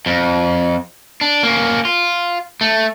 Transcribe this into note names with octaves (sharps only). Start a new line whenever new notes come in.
F2
D4
A#3 C#4
F4
A3